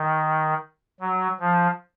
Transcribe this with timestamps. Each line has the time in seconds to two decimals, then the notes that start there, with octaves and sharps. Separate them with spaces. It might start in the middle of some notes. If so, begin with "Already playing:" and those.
Already playing: D#3
1.00 F#3
1.40 F3